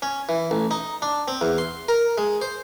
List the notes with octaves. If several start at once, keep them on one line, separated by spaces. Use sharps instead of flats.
C#4
E3
A1
D#4
D4
C4
E2
C6
A#4
G#3
C5